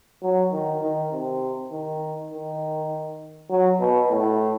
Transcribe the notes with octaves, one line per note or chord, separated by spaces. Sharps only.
F#3
D#3
D#3
C3
D#3
D#3
F#3
B2
A2